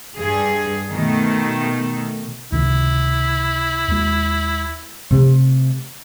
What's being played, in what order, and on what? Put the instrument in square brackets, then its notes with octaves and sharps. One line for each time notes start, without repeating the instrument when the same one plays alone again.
[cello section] G2 G#4
[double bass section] B2 [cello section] D#3 A3
[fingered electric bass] C#2 C3 D#3 [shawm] E4
[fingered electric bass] D#2 G#3
[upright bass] C3 A3